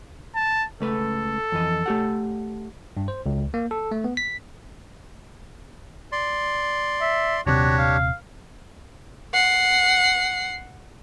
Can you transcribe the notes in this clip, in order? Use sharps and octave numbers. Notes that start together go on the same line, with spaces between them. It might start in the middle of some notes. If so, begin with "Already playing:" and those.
A5
C#2 A3 A4 B4
F2 E3 D#5
A3 G4 F#5
G2
C5
C#2
A#3
A4
A3
B3
B6
D5 C6
E5
D#1 C3 D4 F#4 G4 C#5
F5
F#5 C7